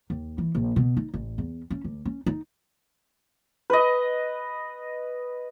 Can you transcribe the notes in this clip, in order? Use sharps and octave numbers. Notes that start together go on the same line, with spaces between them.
D#2
E3
A#1
B2
D#4
A1
E2
C#4
D2
C#4
D#4
B4 D#5